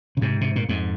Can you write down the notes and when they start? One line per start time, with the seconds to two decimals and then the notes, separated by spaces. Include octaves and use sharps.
0.17 C#3
0.22 G#2 C3
0.41 C3
0.56 A#2
0.69 F2 G#2